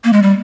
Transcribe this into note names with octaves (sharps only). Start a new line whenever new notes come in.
A#3
G#3
G3